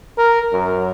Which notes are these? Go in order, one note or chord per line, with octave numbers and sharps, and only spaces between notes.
A#4
F#2